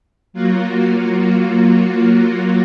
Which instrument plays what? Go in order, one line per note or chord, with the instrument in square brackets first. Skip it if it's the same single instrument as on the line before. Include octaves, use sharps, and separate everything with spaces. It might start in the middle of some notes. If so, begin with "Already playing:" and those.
[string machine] F#3 A#3 F4 F#4